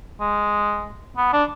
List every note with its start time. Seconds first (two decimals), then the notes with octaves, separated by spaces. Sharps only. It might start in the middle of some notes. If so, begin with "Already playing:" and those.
0.20 G#3
1.17 B3
1.33 D4